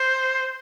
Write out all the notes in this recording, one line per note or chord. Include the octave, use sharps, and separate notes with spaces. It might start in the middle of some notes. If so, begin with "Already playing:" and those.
Already playing: C5